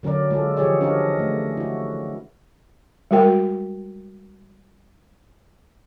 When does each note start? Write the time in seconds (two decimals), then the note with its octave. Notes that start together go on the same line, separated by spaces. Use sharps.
0.03 D3 F#3 C#4 A#4 D5
0.30 G#3 F4 A4
0.57 E3 F3 G4 G#4 C#5 D5
0.81 C#4 D4 F#4 A#4 D#5
1.19 A3
1.57 E4 F#4
3.11 G3 G#3 F#4 A#4 G5